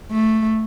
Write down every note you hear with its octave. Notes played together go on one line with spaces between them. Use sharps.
A3